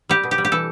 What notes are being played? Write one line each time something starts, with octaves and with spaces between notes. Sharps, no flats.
G3 G4
B2
G4
G3
G4
E3 A4